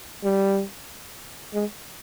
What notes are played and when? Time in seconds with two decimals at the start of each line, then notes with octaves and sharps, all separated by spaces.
0.24 G3
1.54 G#3